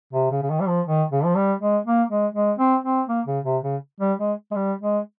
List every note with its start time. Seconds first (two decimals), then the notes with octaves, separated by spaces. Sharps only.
0.13 C3
0.31 C#3
0.42 C#3
0.50 D#3
0.60 G3
0.68 F3
0.86 D#3
1.11 C#3
1.25 F3
1.36 G3
1.61 G#3
1.86 A#3
2.10 G#3
2.35 G#3
2.59 C4
2.84 C4
3.08 A#3
3.27 C#3
3.45 C3
3.63 C#3
4.00 G3
4.20 G#3
4.51 G#3
4.56 G3
4.81 G#3